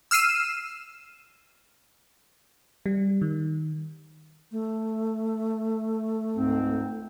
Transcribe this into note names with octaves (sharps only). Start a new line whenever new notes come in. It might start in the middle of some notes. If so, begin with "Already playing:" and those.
E6 F6 C7 D#7 E7
G3
D#3
A3
C#2 G#2 C4